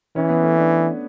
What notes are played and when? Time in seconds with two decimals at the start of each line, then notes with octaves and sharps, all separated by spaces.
0.16 E3 C#4
0.29 B3
0.42 A3 C#4
0.58 B3 D4